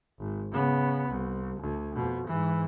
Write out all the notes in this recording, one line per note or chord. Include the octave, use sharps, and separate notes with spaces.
G#1
C#3 B3
C2
D2
F2 B2
G#2 E3